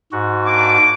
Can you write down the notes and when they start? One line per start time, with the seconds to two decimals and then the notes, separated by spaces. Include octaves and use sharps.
0.12 G#2 F#4
0.44 A#3 D4 D6